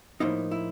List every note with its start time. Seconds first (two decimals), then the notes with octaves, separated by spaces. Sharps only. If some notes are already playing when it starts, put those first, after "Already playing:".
0.20 A2 F3 A#3 D#4 E4
0.51 E4